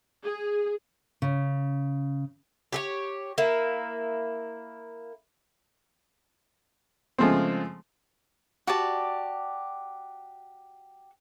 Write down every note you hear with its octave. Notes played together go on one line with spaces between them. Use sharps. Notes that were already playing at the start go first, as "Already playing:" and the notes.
G#4
C#3
G4 G#4 C#5
A#3 E4
C#3 F3 G#3 A3 C4
F#4 G4 D5 A5